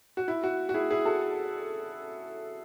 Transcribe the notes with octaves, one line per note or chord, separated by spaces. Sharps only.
F#4
E4
F#4
F#4
E4 G#4
E4 G#4
F#4 A4